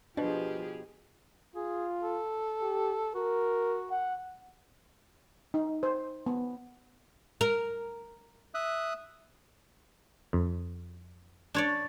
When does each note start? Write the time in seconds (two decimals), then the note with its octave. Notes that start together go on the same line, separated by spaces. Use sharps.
0.17 B2 F3 D4 G4 G#4 B4
1.56 F4 G#4
2.03 A4
2.61 G4
3.15 F#4 A#4
3.91 F#5
5.54 D#4
5.83 C5
6.26 B3
7.41 A#4
8.54 E5 D#6 F#6
10.33 F2
11.54 D4 C#5 D5